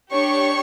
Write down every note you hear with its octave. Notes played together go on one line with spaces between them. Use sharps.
D4 G4 C#5 C#6